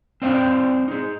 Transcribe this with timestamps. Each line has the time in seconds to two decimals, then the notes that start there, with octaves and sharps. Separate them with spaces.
0.22 C4 C5 D5 F5 G5
0.88 D#4 G#4